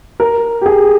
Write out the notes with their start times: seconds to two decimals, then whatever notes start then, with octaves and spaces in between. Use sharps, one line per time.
0.20 A#4
0.61 G4
0.66 G#4